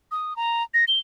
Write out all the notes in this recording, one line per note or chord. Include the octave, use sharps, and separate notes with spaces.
D#6
A#5
A#6
G7